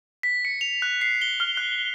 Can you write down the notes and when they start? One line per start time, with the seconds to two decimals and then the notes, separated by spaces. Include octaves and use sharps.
0.23 B6
0.45 C#7
0.61 F7
0.82 F#6
1.01 C7
1.21 G7
1.40 F6
1.57 F#6